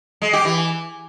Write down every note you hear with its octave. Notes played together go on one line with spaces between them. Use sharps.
G#3
G4
E3